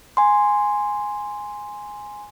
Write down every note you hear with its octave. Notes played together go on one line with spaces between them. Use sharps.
G#5 C6